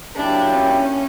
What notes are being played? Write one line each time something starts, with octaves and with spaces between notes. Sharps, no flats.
F#3 A#3 D4 E4 G4
C#4